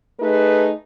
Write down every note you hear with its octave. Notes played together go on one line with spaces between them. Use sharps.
A3 D#4 G#4 B4